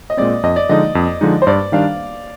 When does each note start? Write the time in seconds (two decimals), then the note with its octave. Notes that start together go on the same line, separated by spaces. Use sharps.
0.10 D#5
0.17 A#2 G#3 C4 D5
0.43 F2 D#5
0.56 D5
0.69 D3 F3 G#3 D#4 D#5
0.95 F2
1.21 D3 F3 G#3 D#4
1.42 C5
1.47 G2 D5
1.72 D#3 G3 D4 F5